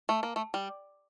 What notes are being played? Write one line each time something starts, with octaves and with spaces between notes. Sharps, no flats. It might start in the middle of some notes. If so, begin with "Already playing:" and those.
A3
A#3
A3
G3